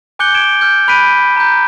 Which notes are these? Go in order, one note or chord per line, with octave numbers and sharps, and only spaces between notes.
G#5 D6 F#6 G6 C#7 G7
G#6 D7 E7
F6 G6
B5 F#6 B6 D7 D#7
A#5 G6